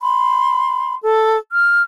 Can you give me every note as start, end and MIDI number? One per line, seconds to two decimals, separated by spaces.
0.02 0.95 83
0.02 0.95 84
1.03 1.36 69
1.51 1.82 89